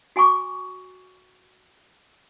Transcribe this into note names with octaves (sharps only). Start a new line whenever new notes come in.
F#4 G#5 A#5 C#6 D6